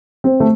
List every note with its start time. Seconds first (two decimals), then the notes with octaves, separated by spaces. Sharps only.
0.24 C4
0.40 A3